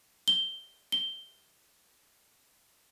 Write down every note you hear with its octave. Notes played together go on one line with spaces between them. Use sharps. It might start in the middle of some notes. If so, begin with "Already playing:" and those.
G7
G7